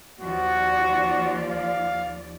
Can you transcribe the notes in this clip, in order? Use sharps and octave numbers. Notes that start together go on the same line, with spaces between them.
D#2 F3 F#4 D5
F5